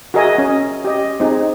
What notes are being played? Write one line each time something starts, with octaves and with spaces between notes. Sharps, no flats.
F#4 G#4 A#4 D#5 E5 G#5
C#4
G4 D#5
C4 D#4 G#4